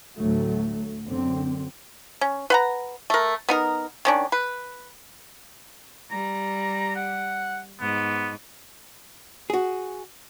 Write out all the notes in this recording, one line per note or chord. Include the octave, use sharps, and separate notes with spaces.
D2 A2 F#3 A3
F#2 D3 C4
C#4
B4 F#5 A#5
A3 A#4
B3 D#4 A#4
D#3 C#4 D4
B4
G3 A#5
F#5
G#2 B3 D#4
F#4 G#4